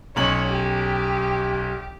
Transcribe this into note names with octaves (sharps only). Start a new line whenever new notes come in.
B1 C#4 C#5 F#7
G4